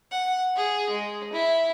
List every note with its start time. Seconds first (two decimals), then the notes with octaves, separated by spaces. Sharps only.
0.11 F#5
0.56 G#4
0.90 G#3
1.33 E4